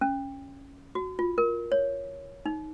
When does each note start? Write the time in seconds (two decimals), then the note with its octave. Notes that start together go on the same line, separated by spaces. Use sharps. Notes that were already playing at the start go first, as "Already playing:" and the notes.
0.01 C#4
0.95 F#4
1.19 F4
1.38 A#4
1.72 C#5
2.46 D#4